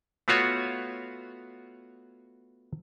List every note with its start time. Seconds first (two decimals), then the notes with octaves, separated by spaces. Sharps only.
0.28 A3 B3 F4 F#4 C#5